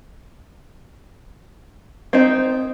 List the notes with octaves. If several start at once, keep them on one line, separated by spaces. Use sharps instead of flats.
C4 D#4